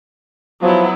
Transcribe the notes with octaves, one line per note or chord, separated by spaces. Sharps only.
F3 F#3 B3 E4